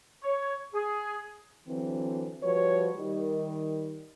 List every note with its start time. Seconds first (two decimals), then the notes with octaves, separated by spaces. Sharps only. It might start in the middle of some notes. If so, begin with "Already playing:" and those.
0.23 C#5
0.74 G#4
1.68 D3 E3 F#3 C4
2.43 F3 G3 F#4 B4 C#5
2.97 D#3 G3